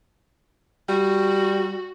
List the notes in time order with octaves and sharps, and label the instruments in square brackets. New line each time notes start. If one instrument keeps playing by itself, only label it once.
[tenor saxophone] G3 [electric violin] F#4